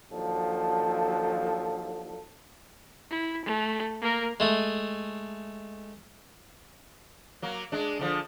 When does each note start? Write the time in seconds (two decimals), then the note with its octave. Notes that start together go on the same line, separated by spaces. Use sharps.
0.12 D#2 F3 F#3 D4 A4
3.11 E4
3.45 A3
4.02 A#3 A#4
4.40 G#3 A3 D#5
7.42 F#3 A#3
7.72 G#3 D4
7.99 D3 D#3 F3